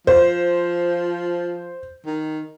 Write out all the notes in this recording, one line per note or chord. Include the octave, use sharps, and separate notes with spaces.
F3 C5
D#3